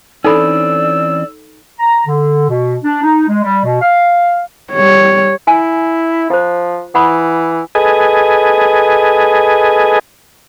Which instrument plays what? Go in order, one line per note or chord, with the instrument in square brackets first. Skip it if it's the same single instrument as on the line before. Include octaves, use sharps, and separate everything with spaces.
[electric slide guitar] E3 C4 C#4 [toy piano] D#4 A4 B5 [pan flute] D5 [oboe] E6
[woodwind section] A#5
D3
B2
D4
D#4
G#3
G3
B2
F5
[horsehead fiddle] G3 C#5
[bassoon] E4 [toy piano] G#5
[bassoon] F3 [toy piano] F4 C5
[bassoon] E3 [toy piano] F#5 B5 D#6
[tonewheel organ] G#4 A4 B4 D#5 G#5